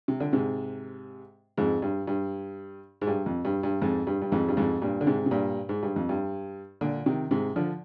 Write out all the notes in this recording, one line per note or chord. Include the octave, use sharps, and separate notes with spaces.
C3
D3
G#2 C3
F2 G#2
G2
G2
G#2
G2
F2
G2
G2
F2 G#2
G2
G2
F2 G#2
G2
F2 G#2
G2 A#2
D3
G#2 C3
C3
G2 A#2
G#2
G2
F2
G2
A#2 D3
C3 D#3
G#2 C3
D3 F3